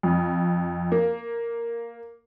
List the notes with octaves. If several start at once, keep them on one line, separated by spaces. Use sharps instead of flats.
F2
A#3